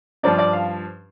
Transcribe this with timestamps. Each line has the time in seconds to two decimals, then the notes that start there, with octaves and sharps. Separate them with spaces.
0.23 G2 F3 D4 D5
0.39 D5
0.53 F5